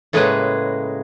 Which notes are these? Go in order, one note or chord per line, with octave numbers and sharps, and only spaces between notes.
A2 C#3 G#3 A#3 G#4 B4